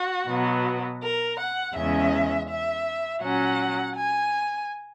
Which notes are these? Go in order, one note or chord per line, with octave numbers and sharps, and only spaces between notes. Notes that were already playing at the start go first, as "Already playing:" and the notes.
Already playing: F#4
B2 F#3 B3
A#4
F#5
E2 C#3 G#3 C#4 E5
E5
A#2 F#3 C#4 F#5
G#5